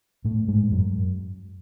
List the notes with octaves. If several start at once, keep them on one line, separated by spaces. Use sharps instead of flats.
A2 A3
G#2 G#3
F#2 F#3